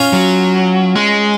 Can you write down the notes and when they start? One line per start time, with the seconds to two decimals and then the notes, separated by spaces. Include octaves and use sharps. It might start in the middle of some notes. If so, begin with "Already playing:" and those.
Already playing: C#4 F4
0.13 F#3
0.95 G#3